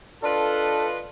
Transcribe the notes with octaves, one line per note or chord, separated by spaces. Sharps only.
D4 F4 A4 B4 D#5